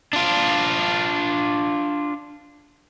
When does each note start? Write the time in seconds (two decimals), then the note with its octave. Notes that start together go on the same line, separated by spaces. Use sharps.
0.13 D4 F4